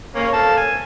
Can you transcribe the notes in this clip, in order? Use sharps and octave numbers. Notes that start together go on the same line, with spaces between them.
A#3 C#4 C#5
A4 F5 A5
G#5